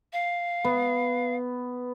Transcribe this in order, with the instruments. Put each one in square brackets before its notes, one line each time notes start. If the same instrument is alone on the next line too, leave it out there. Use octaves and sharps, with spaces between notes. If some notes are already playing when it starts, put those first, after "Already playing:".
[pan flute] F5
[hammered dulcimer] B3